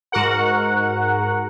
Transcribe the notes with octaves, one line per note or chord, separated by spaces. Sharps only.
G#2 F#4 A#4 F#5